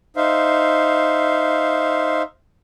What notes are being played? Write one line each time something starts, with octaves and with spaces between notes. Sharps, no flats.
D#4 C5 E5 F5